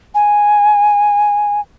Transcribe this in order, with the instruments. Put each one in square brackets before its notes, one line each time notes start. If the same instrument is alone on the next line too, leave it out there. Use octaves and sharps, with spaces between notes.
[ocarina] G#5